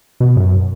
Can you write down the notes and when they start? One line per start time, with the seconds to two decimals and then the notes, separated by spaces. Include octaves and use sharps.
0.20 B2
0.36 F#2